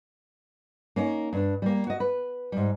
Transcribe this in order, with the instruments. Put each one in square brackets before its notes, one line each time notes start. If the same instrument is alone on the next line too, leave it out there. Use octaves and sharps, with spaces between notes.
[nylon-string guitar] A#3 C#4 D#4
G2 D4
G3 A#3
F#4 D#5
B4
G#2 G3